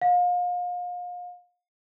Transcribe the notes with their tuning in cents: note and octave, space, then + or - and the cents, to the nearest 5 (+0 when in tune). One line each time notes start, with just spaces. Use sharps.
F5 +35